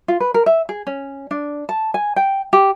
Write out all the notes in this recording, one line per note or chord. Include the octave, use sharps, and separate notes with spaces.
F4
B4
A#4
E5
G#4
C#4
D4
A5
G#5
G5
G4